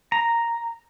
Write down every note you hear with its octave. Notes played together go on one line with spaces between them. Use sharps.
A#5